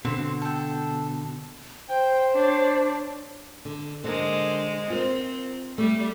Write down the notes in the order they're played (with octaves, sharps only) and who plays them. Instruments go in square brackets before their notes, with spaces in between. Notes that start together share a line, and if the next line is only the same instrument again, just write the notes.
[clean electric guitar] B2 D3 [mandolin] C4
[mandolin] A4 G5
[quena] C5 [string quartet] G5
[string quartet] D4 C#5
[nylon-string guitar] D3
[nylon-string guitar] D3 A#4 [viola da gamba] G#3 C5
[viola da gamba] C4 [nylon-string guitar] F4 A#4 C5
[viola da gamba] G3 [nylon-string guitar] A3